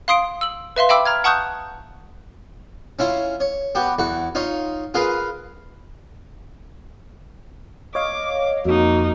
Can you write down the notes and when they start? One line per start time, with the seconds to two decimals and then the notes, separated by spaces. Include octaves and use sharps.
0.08 F5 C6 D#6 C7 D7
0.41 E6 F#7
0.76 B4 E5 F5 C6
0.89 E5 F5 G5 B5 D6 E6
1.05 A#5 F6 G#6
1.24 F#5 A5 C#6 D#6 F#6 G6
2.99 C#4 E4 F4
3.40 C#5
3.75 B3 F#4 G4
3.99 E2 F#4
4.35 D#4 F4 C#5
4.94 F4 G#4 A#4 B4 F5
7.95 C#5 D#5 F5 D6
8.65 F2 A#3 D#4 F#4